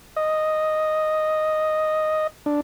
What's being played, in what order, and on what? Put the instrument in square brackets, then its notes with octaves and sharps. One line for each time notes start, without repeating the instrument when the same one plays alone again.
[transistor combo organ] D#5
D4